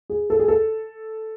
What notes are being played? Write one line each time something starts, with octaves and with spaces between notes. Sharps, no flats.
G#4
A4
G#4
A4